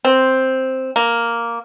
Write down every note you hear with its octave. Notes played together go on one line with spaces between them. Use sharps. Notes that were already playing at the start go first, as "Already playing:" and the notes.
C4
A#3